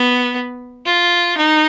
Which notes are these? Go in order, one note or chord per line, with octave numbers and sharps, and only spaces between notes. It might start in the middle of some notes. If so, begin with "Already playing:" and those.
Already playing: B3
F4
D#4